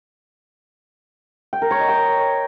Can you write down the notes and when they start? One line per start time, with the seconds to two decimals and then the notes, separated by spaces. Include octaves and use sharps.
1.53 G5
1.62 A#4
1.71 C#5
1.80 D#5
1.89 G5